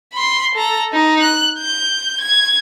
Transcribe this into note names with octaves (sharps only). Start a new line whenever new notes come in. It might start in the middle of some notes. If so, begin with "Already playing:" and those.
B5 C6
A4 A#5
D#4
F#6
G6
G#6